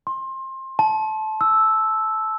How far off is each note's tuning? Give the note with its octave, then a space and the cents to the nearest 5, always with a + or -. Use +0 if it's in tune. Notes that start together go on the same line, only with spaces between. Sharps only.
C6 +25
A5 -20
E6 -5